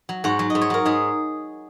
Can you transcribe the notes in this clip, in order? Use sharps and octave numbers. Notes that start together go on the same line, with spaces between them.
F#3
G#2 F#4
F#3
D#5
G#2
C#5
F#3 A#4
G#2 G#4